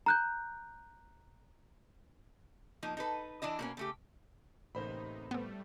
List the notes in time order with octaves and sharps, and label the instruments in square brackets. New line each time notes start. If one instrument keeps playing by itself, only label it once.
[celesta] A#5 F#6 G6
[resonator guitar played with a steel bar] F3 A#3 D#4
D#4 A4 B4
E3 D4 E4 D#5
B2 A#3 C#4
C#3 A3 G4
[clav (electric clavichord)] A1 A#3 [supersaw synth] C3 D#4 [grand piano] C5 B5
[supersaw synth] A2 G3 A3 [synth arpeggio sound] B3 C4